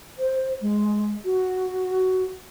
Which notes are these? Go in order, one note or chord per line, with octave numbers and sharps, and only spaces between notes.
C5
G#3
F#4